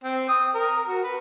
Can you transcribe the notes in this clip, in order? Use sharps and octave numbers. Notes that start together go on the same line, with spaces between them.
C4
D#6
A#4
F#4
B4